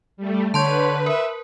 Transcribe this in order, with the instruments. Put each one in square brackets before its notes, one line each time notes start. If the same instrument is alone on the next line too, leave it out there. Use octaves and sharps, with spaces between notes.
[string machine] G3 A3
[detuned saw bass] D3 [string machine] B4 [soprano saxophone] C#5 [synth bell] A5 C6 G6
[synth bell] A#4 [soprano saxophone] E5